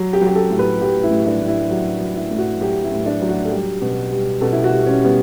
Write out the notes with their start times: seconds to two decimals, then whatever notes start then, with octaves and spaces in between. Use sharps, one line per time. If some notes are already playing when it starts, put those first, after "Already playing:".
Already playing: F#3
0.13 G4
0.21 F#3
0.27 G4
0.35 A4
0.50 A2
0.59 B4
0.81 F#3 G4
1.03 E4
1.11 A2
1.26 D4
1.40 A2
1.48 E4
1.71 F#3 F#4
2.01 F#3
2.16 E4
2.31 A2
2.38 F#4
2.61 F#3 G4
2.84 E4
2.92 A2
3.06 D4
3.22 F#3
3.28 F#4
3.45 A4
3.51 G3 G4
3.82 B2
4.11 G3
4.41 B2 A4
4.53 E4
4.64 F#4
4.71 G3
4.87 C#4
5.01 G3 B3